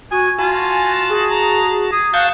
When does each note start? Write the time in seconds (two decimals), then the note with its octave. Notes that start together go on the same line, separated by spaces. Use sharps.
0.11 F#4 G#5
0.39 F4 F#4 G#5 A5
1.10 G#4
1.31 A#5
1.92 G#4
2.14 F#4 F5 A5 C#6 G6